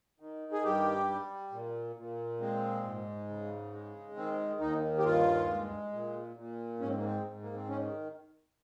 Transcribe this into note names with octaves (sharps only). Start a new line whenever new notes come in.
D#3
G#4
G2 G4
G3
A#2
A#2
G#3 C4
G#2
C#3
G#3
D#3 C4
D#2 D#4
G4
G2 F4
G#3
A#2
A#2
G#2 C#4
C4
A#3
C4
G#2
A#3
C4
D#3 C#4